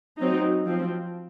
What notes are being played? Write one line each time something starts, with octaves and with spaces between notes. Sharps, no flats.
F#3 C4 D#4
F3 C4